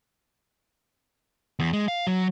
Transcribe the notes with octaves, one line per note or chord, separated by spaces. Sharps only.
E2
G#3
F5
F#3